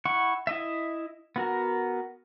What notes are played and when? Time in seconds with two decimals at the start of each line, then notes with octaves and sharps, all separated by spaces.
0.05 E4 F#5 C#6
0.47 E4 D#5 E5
1.36 B3 F#4 A#4